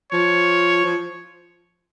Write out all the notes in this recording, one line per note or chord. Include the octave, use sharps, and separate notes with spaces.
F3 C#5
F3